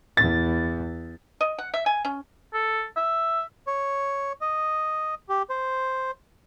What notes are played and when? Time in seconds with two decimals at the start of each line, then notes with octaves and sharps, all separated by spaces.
0.17 E2 A6
1.41 D#5
1.58 F#5
1.74 E5
1.86 G#5
2.05 C#4
2.54 A4
2.97 E5
3.67 C#5
4.41 D#5
5.29 G4
5.50 C5